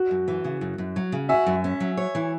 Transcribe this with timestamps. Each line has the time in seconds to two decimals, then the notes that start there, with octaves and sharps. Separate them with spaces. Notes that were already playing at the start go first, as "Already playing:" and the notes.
Already playing: F#4
0.11 F#2
0.28 E3
0.44 C#3
0.61 F#2
0.78 F#2
0.96 F#3
1.12 C#3
1.29 F#4 E5 G#5
1.46 F#2
1.64 C#4
1.80 F#3
1.97 C#5
2.15 E3